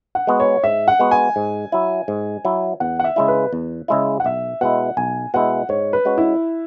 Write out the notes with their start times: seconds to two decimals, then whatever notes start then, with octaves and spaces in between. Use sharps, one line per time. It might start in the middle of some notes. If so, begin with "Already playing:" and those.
0.15 F#5
0.27 G#3 B3 F#4
0.40 C#5
0.64 G#2 E5
0.88 F#5
0.99 G#3 B3 F#4
1.11 G#5
1.36 G#2
1.72 F#3 E4
2.08 G#2
2.45 F#3 E4
2.80 E2 F#5
2.99 F#5
3.04 E5
3.16 C#3 G#3 E4
3.28 B4
3.53 E2
3.88 C#3 G#3 E4
4.20 F#5
4.24 B1 E5
4.61 B2 G#3 E4 F#5
4.97 B1 G#5
5.34 B2 G#3 E4 F#5
5.69 G#2 C#5
5.93 B4
6.05 G#3 C#4 F#4
6.18 E4